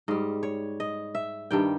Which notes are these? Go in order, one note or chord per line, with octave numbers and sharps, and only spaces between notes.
G#2 G3 D#5
C#5
D#5
E5
G2 D#3 G3 G5